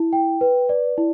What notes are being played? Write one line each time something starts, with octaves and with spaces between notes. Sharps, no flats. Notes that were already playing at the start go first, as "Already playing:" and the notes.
Already playing: E4
G5
B4
D5
E4